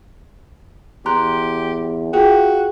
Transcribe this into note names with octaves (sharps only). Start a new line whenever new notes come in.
E2 G4 A#5 C6 F#6
F4 F#4 G#4 G5